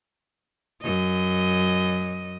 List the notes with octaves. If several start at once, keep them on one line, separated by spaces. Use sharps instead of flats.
F#2 D#5